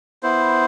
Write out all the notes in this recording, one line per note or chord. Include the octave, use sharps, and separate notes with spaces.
B3 E4 C5